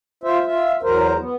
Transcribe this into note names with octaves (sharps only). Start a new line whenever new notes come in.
F4 C5 E5
F4 E5
E2 F#3 A#4 C5
B3